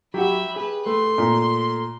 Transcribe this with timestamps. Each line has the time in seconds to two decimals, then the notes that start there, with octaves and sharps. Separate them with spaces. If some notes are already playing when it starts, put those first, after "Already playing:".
0.14 F#3 F#4 G4 E5 B5
0.56 G#4 B4
0.87 A3 C6
1.18 A#2